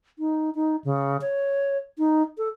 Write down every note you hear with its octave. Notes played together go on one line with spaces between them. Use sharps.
D#4
D#4
C#3
C#5
D#4
A4